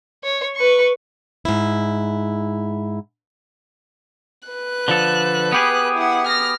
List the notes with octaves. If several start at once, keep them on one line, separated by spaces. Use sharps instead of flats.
C#5
B4 C#6
G#2 E4
B4 F#6
D3 F3 A4
B3 G4 G#4
E4 F#5
F6 A#6